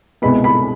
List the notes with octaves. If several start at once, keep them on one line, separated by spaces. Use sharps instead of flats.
C2 B2 G#3 B3 B5
B5